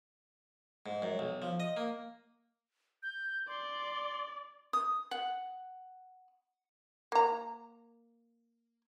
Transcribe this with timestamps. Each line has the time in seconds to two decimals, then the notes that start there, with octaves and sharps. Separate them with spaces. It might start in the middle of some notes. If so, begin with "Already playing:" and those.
0.86 G#2
1.02 F#2
1.19 B1
1.42 F3
1.60 D#5
1.77 A#3
3.03 G6
3.48 D5 C6
4.73 D#6
5.11 F#5
7.12 A#3 A#5